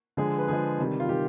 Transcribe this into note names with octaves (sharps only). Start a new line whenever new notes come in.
D3 F3 G#3 G#4
B4
D3 F3 G#3 G#4
C3 D#3 G3
F4
C3 D#3 G3 G4